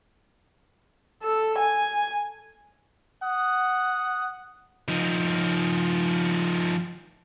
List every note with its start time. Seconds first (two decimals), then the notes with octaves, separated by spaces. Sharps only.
1.23 A4
1.59 G#5
3.24 F#5 D#6
4.88 F3 D#4